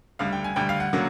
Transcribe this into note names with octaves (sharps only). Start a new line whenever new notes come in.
D2 D3 G3 F5
G5
G#5
D2 D3 G3 G5
F5
F#5
D3 F#3 A#3